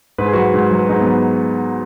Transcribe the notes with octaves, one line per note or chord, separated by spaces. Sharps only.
G#2 B4
G#4
F#3 F#4 B4
G#2
F#3
B4
G#2 D#4 G#4
B3
F#3